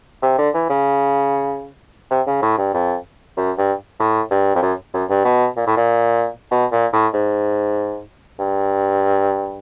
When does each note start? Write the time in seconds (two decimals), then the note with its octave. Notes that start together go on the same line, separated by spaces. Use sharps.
0.22 C3
0.38 D3
0.54 E3
0.69 C#3
2.10 C3
2.27 C#3
2.42 A2
2.58 G2
2.73 F2
3.37 F#2
3.58 G2
3.99 A2
4.31 G2
4.55 F2
4.62 F#2
4.94 F#2
5.09 G2
5.25 B2
5.56 A#2
5.67 A2
5.76 A#2
6.51 B2
6.72 A#2
6.92 A2
7.13 G#2
8.39 G2